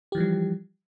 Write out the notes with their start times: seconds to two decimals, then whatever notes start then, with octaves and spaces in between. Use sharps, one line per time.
0.12 G4
0.15 E3
0.18 F3
0.20 G3